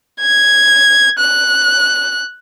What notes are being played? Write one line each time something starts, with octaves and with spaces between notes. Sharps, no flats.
G#6
F#6